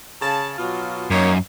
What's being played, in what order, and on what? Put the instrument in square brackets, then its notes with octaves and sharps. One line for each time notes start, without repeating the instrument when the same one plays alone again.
[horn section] C#3 A5
B2 F#3 F4
[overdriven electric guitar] F#2 [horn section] A#3 D#4 C#5